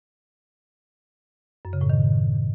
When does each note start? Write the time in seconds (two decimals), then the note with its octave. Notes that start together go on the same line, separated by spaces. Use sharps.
1.65 F#2
1.73 C#3
1.81 A2
1.90 D#3